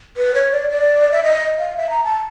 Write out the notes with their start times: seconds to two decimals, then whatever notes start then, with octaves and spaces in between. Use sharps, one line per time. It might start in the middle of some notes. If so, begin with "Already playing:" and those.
0.17 B4
0.35 C#5
0.52 D5
0.70 D5
1.12 E5
1.24 D#5
1.59 F5
1.77 E5
1.90 A#5
2.04 A5